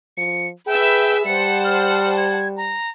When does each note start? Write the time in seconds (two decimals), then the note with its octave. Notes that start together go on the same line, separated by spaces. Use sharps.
0.17 F3 C#7
0.66 G#4 B4 E5 G5 E6
1.26 G3 C5 F#5 A5 C#7
1.64 F6
2.17 G#6
2.57 A#5